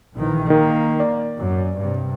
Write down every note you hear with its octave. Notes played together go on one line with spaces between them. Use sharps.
A#1 D#3 E3
D#3 A#3
D5
F#2
G2 C3